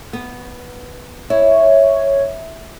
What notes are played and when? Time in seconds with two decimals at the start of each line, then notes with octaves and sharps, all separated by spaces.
0.13 B3
1.30 E4 C#5